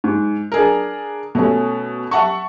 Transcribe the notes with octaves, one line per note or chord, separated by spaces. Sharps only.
G#2
D4 G#4 A#4
B2 A3 C#4
E5 F#5 A5 C#6